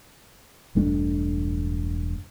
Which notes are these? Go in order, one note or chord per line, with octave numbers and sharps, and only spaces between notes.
E1 G2 A3 D4